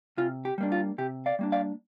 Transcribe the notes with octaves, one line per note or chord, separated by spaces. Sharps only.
C3 F4
G4
G3 A#3 D4
F4
C3 G4
D5 F5
G3 A#3 D4
D5 F5